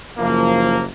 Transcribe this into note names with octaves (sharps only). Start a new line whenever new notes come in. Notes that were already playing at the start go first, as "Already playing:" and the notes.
F#1 F3 A#3